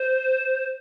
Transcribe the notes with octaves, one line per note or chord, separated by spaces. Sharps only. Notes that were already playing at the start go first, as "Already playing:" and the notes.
Already playing: C5